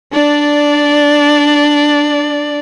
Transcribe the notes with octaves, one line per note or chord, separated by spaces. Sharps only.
D4 D5